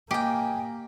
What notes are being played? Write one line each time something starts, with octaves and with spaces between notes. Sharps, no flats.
A#3 G4 D#5 G5 G#5